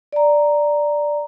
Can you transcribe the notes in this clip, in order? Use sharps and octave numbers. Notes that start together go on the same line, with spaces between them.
D5 A#5